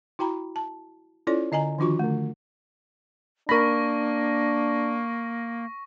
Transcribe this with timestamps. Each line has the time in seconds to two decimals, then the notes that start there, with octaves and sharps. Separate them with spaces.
0.19 E4 F#4 G5 A#5 B5
0.56 A5
1.27 C#4 E4 F4 A4 C#5 D5
1.52 D3 D#5 G#5 A#5
1.79 D#3 F3 D4 F4 F#4 C#6
1.99 D3 A3
3.49 A#3 D4 A#4 B5 C#6 A#6